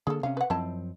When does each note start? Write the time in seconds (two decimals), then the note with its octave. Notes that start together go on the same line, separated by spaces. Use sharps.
0.07 D3 A#3 G#4 A4
0.23 C3 C#4 F5
0.37 B4 F#5
0.50 F#2 F3 C4 E4 D#5 A5